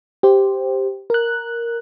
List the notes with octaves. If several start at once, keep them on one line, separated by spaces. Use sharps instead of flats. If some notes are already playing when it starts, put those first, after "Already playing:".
G4 C5
A#4 F#6